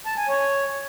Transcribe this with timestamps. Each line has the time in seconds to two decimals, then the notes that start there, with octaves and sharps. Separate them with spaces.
0.06 A5
0.17 G#5
0.29 C#5